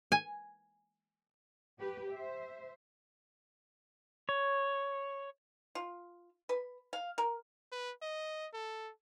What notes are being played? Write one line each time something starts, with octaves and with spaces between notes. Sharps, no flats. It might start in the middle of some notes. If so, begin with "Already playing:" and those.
G#5
G4 B4
C5 E5
C#5
F4
B4
F5
A#4
B4
D#5
A4